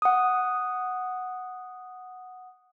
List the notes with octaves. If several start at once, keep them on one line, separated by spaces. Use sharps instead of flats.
F#5 D#6